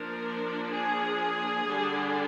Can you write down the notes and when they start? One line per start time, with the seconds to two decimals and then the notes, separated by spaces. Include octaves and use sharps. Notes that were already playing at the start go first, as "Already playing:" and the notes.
Already playing: F3 A#3 D4 A#4
0.71 G#4
1.65 D3 G3 D4